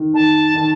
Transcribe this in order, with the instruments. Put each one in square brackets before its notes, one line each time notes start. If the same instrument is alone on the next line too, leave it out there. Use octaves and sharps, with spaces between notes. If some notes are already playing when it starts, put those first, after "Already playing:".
Already playing: [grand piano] D#3
[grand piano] D#3 [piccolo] A5
[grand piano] D#3